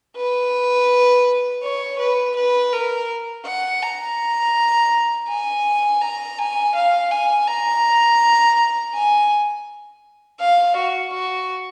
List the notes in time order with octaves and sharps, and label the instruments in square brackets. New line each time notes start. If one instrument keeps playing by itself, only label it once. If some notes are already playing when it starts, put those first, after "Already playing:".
[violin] B4
C#5
B4
B4
A#4
F#5
A#5
G#5
A#5
G#5
F5
G#5
A#5
G#5
F5
F#4
F#4